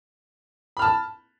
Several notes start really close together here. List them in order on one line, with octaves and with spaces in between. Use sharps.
B5 F6 A5